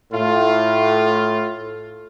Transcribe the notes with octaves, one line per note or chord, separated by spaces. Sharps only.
A2 F4